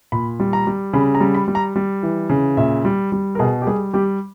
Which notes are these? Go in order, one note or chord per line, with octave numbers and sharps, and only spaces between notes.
A#2 B5
G3
A#5
G3
C#3 B5
A#5
G3
B5
G3
A#5
G3
E3
C#3
A#2 E5
G3
G3
A#4
B2 G#4
G4
G3 G#4
G3 G4